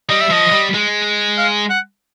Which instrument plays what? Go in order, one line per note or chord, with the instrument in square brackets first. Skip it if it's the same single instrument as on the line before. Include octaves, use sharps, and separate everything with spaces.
[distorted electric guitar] G3 [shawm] D#5
[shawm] E5
[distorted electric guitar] F3 [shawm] D#5
[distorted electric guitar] G3
G#3
[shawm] F5
F#5